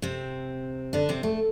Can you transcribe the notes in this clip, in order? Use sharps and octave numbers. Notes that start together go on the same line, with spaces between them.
C3 C4
D3 D4
C3 C4
A3